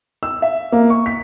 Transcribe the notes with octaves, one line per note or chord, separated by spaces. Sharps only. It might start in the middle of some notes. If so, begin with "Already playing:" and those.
E6
E5
A#3
C#6
B6